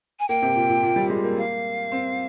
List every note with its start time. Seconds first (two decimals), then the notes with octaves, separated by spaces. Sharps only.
0.20 G#5
0.29 A#3 G5
0.42 C3
0.56 A#2
0.70 A#2
0.83 A#2
0.96 G3
1.10 G#3
1.24 A#3
1.38 F5
1.92 C4